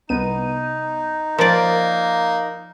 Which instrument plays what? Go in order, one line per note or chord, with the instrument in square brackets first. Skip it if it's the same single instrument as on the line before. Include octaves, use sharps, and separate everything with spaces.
[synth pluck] C2 B3 D#7 [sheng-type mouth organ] D#4
[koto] F3 D5 [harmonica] A#3 [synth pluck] A#4